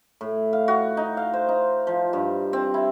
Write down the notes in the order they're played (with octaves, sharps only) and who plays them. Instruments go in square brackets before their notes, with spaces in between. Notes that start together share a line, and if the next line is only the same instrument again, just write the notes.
[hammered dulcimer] A2
F5
F#4
D#4
F5
C5
D#4
F3
G2
C4
E4